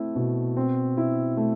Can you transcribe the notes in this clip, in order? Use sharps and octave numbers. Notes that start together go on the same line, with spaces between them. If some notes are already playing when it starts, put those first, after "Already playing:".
Already playing: A3 C4 E4
B2
C4
E4
A3